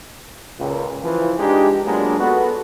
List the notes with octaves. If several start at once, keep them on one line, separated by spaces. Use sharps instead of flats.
C#2 A#2
E3 F3
G#3 D4 D#4 G4
F#3 G#3 A#3 B3 D4 F4
B3 F#4 A4